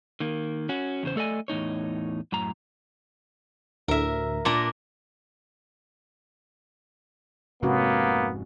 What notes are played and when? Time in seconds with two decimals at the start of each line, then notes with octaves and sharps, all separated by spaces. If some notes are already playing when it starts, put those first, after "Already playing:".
0.20 D#3 A#3
0.69 C#4 F#4
1.03 E2 C#3 C5
1.16 A3 A4 D5 D#5 G#5
1.48 E2 A2 D#4 C#5
2.32 F#2 A2 A#5
3.88 D2 A2 A#4 E5
4.45 A#2 D4 A#5
7.63 F1 G#2 C3 G#3 A#3 B3 C#4 F#4